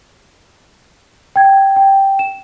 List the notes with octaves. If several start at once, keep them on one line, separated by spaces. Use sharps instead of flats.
G5 G#6
G5
E7